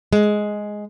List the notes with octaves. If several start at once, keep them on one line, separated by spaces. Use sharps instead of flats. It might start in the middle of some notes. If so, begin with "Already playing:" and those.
G#3